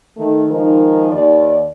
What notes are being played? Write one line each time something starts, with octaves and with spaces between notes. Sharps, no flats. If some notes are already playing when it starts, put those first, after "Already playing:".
D#3 A3
D#3 F3 G#3 D#4 A#4
D#2 D5